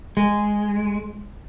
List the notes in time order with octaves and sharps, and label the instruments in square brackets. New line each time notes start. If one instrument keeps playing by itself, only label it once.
[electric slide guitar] G#3